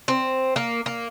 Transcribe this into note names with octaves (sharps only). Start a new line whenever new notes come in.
C4
A#3
A#3